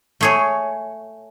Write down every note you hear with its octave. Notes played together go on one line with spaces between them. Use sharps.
A3 G#4 C#5